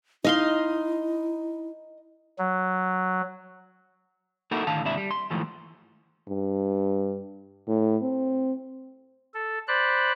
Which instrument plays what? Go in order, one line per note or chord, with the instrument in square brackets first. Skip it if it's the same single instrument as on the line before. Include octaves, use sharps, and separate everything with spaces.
[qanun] D#4 F5 C6 [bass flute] E4 [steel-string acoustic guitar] D#5
[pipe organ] F#3
[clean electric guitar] A#3 D#4 E4 F#4 A4 A#4
A2 D3 D#3 F5 A5
D#2 G#2 C3 D4 E4 E5
G3
C6
D#2 G#2 E3 F3 A3
[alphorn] G2
A2
C4
[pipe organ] A4
C5 D5 B5 F#6